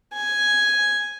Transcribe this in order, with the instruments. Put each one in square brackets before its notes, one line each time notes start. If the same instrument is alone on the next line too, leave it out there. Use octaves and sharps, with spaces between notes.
[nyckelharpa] G#5